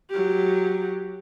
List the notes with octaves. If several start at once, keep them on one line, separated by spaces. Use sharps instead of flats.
F#3 G4